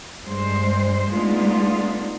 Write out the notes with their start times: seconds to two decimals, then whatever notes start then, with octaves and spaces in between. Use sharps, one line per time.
0.23 G2 G#3 C5
1.11 G#3 A3 B3 D4 D#4 F4